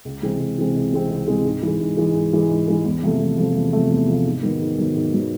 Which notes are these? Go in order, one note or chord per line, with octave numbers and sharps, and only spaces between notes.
C#2
C3 E3 G#3 C4
C#2
C3 E3 G#3 C4
C#2
C3 E3 G#3 C4
C#2
C3 E3 G#3 C4
G#2
E3 G#3
G#2
E3 G#3
G#2
E3 G#3
G#2
E3 G#3
E2
C3 F3 A3
E2
C3 F3 A3
E2
C3 F3 A3
E2
C3 F3 A3
G#2
D#3 F#3 B3
G#2
D#3 F#3 B3
G#2
D#3 F#3 B3